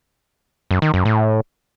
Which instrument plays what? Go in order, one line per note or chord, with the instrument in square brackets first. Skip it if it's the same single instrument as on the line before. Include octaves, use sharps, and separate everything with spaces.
[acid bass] F#2
D#3
F#2
A2